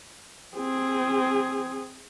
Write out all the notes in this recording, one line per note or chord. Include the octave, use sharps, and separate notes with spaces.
C4 G#4